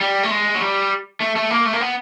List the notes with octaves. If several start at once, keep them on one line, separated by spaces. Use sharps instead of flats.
G3
A3
G#3
F#3
G3
A3
A3
A#3
A3
A#3
B3